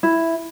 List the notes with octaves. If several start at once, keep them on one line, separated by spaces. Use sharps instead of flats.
E4